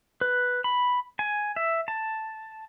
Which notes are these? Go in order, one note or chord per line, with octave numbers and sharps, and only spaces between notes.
B4
B5
G#5
E5
A5